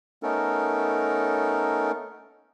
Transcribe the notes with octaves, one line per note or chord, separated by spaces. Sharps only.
A3 B3 C#4 D#4 A4 A#4